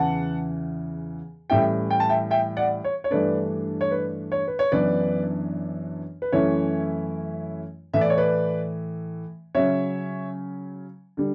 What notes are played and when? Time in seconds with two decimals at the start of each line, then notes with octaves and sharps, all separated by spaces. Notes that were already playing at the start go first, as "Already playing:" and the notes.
Already playing: E2 C#3 E3 F#5 A5
1.50 A2 E3 G3 C#4 E4 E5 G5
1.90 G5
2.00 A5
2.09 E5 G5
2.31 E5 G5
2.57 D5 F#5
2.84 C#5
3.04 C#5
3.11 G2 E3 A3 D4 B4 D5
3.81 C#5
3.91 B4
4.32 C#5
4.48 B4
4.59 C#5
4.72 F#2 E3 B3 D4 B4 D5
6.22 B4
6.32 F#2 E3 A3 C#4 E4 C#5
7.93 A2 E3 A3 E5
8.01 D5
8.10 C#5
8.18 B4 D5
9.55 C#3 F#3 C#4 C#5 E5
11.17 D3 G3